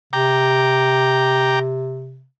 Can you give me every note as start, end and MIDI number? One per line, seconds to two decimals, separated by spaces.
0.13 2.25 48
0.13 1.59 79
0.13 1.59 82
0.13 1.59 86